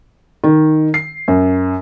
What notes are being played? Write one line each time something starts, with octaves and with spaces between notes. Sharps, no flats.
D#3
C7
F#2